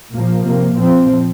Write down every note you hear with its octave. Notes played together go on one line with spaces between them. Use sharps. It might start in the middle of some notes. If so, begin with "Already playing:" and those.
A#2 F3 A#3
C3 A#3
A#2 F3 C4